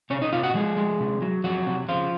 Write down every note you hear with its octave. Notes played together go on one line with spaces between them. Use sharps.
C3 C#4 C#5
D#4 D#5
C3 F4 F5
F#4 F#5
F3 G#3 G#4
G#3
C3
F#3
F2 F#3 F#4
C3
C#3 F3 F4